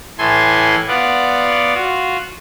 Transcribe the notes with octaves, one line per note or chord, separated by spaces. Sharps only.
A2 E3 A4 G#5 C6
B3 F4 D5 F#5
F4 F#4